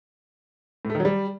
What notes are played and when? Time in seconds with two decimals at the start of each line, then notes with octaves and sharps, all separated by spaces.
0.85 A2
0.90 A3
0.95 D#3
1.00 F#3
1.05 G3